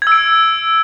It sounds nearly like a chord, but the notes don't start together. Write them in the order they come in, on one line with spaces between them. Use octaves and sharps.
G#6 E6 D7